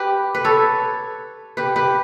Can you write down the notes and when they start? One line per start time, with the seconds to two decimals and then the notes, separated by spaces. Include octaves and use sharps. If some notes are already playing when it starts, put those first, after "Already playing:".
Already playing: G4 B4
0.35 B4
0.45 A4 C#5
1.57 G4 B4
1.76 G4 B4